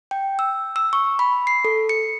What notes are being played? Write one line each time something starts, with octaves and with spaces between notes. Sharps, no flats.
G5
E6
E6
C#6
B5
C7
A4
C#7